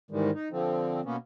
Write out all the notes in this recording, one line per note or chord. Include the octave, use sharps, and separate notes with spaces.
G#2 D#3 E3 G3 G#3
D#4
D3 F3 C4
B2 A#3 B3 C#4